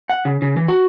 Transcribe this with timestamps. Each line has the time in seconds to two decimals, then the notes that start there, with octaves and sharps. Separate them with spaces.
0.10 F#5
0.25 C#3
0.42 C#3
0.57 E3
0.68 F#4